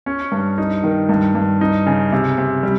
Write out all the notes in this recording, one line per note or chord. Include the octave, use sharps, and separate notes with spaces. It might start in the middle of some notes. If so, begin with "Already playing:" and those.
C#4
G2
D#4
D#3
G2
G2
D#4
C#3
C3
C3
G3